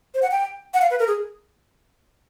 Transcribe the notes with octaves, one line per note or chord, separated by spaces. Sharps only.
C5
F#5
G5
F#5
F5
B4
A#4
G#4